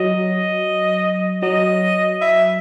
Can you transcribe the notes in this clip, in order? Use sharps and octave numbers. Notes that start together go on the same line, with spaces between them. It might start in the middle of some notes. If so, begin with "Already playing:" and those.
Already playing: F#3 D#5
F#3 D#5
E5